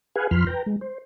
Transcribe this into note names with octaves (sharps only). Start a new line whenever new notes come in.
G#4 B4 F5 F#5 G#5
F2 F3 B5 C6 F6
B4 G5 A#5
G#3
C5